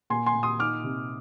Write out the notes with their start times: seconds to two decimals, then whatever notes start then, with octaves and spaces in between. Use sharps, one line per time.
0.10 A#2 G#5 C6
0.26 G#5 C6
0.35 A#2
0.43 C6 D#6
0.59 D#4 D6 F6
0.84 C3